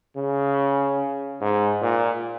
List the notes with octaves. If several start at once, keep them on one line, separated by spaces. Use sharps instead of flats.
C#3
G#2
A#2